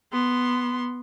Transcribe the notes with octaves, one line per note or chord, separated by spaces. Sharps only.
B3 C6